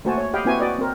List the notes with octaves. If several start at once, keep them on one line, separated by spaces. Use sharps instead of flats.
A3 A#3 F#4 C5 G#5 A5
C#5
G4 D#5 F5 G5 B5
A#3 C4 E4 F#4 B4 G#5
F#4 B4 D5 D#5
C4 A#4